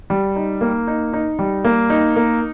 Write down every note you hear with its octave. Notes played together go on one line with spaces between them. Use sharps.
G3
D#4
A#3
D#4
D#4
G3
A#3
D#4
A#3